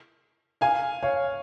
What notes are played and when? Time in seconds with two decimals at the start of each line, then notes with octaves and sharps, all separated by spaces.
0.61 F5 G#5
1.03 C#5 F5